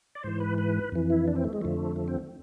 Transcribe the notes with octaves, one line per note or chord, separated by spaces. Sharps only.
D5
G#2 E3 C5
B4
B4
F2 E3
E4
D4
C4
A3
G#3
F2 D3 F3 A3
A3
C4